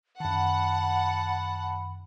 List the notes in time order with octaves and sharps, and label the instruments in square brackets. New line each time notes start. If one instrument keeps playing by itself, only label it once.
[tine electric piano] F#2 D#3 [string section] F#5 [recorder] A5 [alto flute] B5